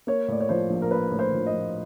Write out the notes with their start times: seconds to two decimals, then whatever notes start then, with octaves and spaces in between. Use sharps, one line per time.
0.07 A#3 C#5
0.28 A2 D5
0.40 C#5
0.49 F3 C5
0.70 A#1
0.82 A#4
0.91 A#3 B4
1.11 A2
1.19 C5
1.33 F3
1.46 D#5
1.53 A#1